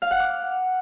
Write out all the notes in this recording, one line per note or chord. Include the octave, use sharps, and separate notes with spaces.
F5
F#5
D6